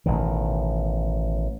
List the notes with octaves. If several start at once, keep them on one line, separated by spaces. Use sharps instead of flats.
A1 B2 D#3